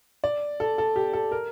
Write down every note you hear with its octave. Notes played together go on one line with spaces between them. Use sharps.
D5
A4
A4
G4
A4
A#4